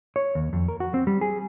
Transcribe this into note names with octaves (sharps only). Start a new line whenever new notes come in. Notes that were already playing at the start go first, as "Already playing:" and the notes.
C#5
D#2
F2
A#4
F#4
C4
G3
G#4